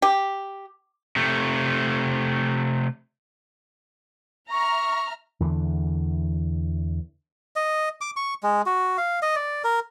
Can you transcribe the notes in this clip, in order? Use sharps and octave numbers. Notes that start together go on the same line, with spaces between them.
G4
C3 A3
E5 A#5 C#6 F6
E2 D3 E3
D#5
D6
C#6
G#3
F#4
F5
D#5
D5
A#4